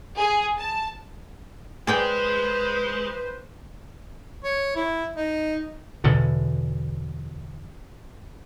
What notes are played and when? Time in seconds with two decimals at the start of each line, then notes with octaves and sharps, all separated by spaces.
0.17 G#4
0.58 A5
1.87 G#3 G#4 B4 C5 D5 G5
4.44 C#5
4.76 E4
5.17 D#4
6.04 E2 B2 D3